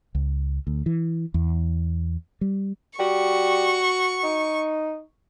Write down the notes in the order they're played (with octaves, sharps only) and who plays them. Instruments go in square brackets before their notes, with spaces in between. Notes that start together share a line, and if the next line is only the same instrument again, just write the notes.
[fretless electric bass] C#2
D2
E3
E2
G3
[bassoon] G3 [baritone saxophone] F#4 [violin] C#6
[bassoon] D#4